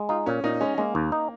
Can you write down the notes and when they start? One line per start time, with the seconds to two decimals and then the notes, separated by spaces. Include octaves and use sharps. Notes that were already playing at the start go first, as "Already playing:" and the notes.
Already playing: G#3
0.09 D#4 F4
0.26 A#2 C#4
0.44 A#2 D#4
0.61 G#3 C#4
0.78 G#3 A#3
0.95 D#2
1.12 D#4